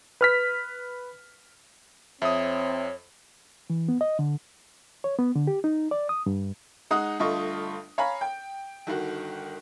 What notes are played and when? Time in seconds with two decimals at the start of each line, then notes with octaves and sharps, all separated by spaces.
0.21 B4 F6 B6
2.22 F2 C4 C#5 E5 D#6
3.70 E3
3.88 B3
4.01 D#5
4.19 D3
5.04 C#5
5.19 B3
5.35 D3
5.47 G4
5.64 D#4
5.91 D5
6.09 D#6
6.26 G2
6.91 G#3 D#4 F#5 D#6
7.19 G1 G2 A3 F4 D#5 C#6
7.98 C#5 F5 G#5 A#5 B5
8.21 G5
8.87 G1 D#3 F#4